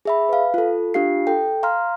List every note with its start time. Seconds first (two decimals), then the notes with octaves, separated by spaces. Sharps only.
0.05 G#4 E5 B5
0.29 B4 F5
0.54 F4 A4
0.94 D4 F4 G4 F5 C7
1.27 A4 G5
1.63 F5 A#5 C6 F6